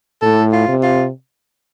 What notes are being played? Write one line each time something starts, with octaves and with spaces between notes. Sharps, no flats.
A2 A4
F4
C3
F4